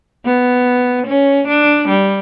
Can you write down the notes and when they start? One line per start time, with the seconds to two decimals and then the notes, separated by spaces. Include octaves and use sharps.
0.25 B3
1.07 C#4
1.47 D4
1.88 G3